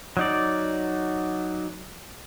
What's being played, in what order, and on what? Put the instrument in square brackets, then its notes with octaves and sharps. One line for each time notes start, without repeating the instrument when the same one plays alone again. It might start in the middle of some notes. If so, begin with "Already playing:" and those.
[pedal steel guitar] F#3 D#4 D5